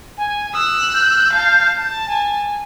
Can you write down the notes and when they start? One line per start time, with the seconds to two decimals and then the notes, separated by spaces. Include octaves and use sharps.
0.18 G#5
0.53 D#6 E6 F#6
0.94 G6
1.33 F5 A5
1.76 A5
2.07 G#5